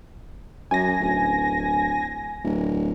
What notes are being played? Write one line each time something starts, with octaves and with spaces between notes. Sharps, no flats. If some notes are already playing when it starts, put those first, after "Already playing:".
F#2 G#5 A#6
D1
D1